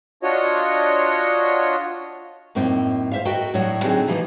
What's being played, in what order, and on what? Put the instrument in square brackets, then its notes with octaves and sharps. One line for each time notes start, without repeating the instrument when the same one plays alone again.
[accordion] D4 F4 F#4 C#5 D#5
[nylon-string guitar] F#2 A2 A#3 C4 D#4 F4
C5 E5 F5
F#4 A4 A#4 D#5 G5
A2 F#3 G3 C#5 F#5
D3 F#3 C4 D#4 G#4 A4
E3 F3 G3 A3 A#3 D#4